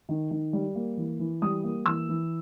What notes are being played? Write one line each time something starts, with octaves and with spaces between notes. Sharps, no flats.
D#3
D#3
G3
A#3
E3
E3
G3 D#6
A#3
E3 E6
E3